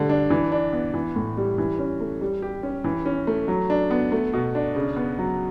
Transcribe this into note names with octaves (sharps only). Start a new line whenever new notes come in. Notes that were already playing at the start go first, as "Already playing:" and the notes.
Already playing: D3 G3 A3
D4
E3
D4
B3
E3
A2
G3
E3
C#4
A3
G3
G4
C#4
E3
C#4
A3
F#3
D4
B3
A3
B2
D4
C#3
B3
F#3